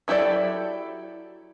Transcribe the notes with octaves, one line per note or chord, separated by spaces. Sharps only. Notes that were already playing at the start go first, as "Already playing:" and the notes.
F#3 E4 G4 A4 D5